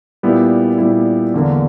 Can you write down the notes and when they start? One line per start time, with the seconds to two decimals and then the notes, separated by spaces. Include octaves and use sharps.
0.23 A#2 G3 B3 E4
0.78 A#2 G3 B3 E4
1.34 E2 D3 A#3